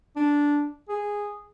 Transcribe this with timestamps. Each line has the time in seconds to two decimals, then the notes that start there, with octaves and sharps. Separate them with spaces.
0.16 D4
0.89 G#4